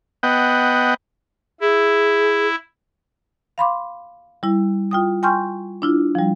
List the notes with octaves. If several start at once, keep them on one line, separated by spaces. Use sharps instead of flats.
B3 D#5 F#5 G5
E4 G#4
F5 B5 C6 D6
G3 E4
F4 G5 D#6
G5 G#5 C6 C#6 F6 G6
D4 E4 F4
F3 G3